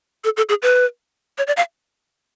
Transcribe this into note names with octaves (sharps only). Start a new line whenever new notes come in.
A4
A4
G#4
B4
C#5
D5
F5